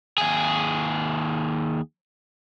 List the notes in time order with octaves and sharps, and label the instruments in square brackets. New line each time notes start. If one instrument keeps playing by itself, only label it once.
[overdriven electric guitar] D#2 G#4